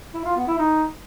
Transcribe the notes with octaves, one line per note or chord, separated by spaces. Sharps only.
E4
F4
B3
E4
D#4